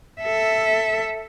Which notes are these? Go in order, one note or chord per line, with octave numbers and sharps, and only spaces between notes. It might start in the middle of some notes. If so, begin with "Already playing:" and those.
A4 E5